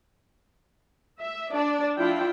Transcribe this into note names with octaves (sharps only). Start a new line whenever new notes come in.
E5
D4 D5
F3 D4 E4 F4 G5